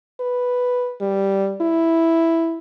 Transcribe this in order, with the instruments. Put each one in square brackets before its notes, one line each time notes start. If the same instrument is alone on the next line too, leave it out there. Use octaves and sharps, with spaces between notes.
[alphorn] B4
G3
E4